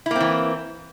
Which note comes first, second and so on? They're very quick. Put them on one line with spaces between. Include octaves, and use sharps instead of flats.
E4 A#3 C4 E3